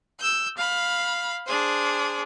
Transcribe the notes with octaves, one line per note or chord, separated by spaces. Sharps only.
E6 G6
F5 B5
D4 G#4 C5